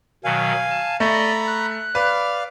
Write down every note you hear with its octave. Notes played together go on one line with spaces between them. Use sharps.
B2 D#3 F#3 F5 G#5
A5
A3 D5 D#5 A#5 B5
F#6
B4 D5 F5 F6